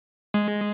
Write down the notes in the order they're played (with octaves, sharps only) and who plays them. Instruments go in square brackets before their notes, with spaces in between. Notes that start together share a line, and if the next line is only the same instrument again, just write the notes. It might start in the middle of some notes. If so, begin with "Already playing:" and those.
[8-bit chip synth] G#3